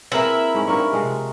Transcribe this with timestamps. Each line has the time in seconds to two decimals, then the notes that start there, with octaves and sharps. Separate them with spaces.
0.12 A#3 C4 E4 G#4 A#4 B4
0.55 G#2 C#4
0.67 G2 G3 A#4 C#6
0.93 C3 F3 G#3